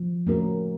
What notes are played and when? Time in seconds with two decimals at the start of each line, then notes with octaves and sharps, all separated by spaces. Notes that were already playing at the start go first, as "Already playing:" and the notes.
Already playing: F3
0.27 A3 C#4 F#4 A#4